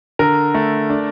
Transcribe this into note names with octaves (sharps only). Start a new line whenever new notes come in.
D3 A#4
A3
D4